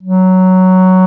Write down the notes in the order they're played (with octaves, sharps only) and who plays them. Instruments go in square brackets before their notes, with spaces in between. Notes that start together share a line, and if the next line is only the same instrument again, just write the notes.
[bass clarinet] F#3